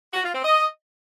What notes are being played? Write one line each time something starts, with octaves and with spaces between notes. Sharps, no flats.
F#4
F4
C4
D#5